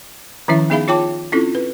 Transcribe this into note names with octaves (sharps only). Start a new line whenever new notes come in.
D#3 F3 C#4 E4 E5
B3 D#4 G#4 E5 F5 B5
F4 C#5 G5 A5 D6
C4 C#4 E4 F4 A4
B4